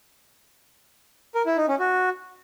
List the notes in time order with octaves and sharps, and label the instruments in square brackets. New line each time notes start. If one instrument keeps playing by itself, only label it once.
[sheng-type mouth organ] A#4
E4
D#4
C#4
F#4